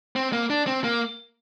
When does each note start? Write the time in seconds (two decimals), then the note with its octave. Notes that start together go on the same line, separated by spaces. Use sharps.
0.16 C4
0.33 A#3
0.50 D4
0.67 C4
0.84 A#3